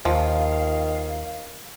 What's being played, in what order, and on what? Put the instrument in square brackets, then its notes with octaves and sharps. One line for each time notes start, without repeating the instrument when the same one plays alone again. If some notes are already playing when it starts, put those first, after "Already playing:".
[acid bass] D#2 [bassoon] D#3 [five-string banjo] F3 [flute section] F5